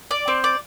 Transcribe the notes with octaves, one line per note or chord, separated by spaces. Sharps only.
D5
C4
D5